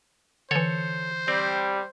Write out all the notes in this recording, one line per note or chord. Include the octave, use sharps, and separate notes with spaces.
D3 E3 A4 C5 C#5
G3 C4